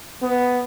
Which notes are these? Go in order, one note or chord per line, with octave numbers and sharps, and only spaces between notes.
B3